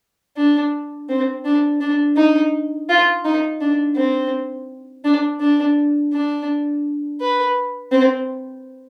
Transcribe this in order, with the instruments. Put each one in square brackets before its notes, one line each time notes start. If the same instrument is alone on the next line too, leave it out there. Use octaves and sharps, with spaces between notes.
[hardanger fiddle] D4
C4
D4
D4
D#4
F4
D#4
D4
C4
D4
D4
D4
B4
C4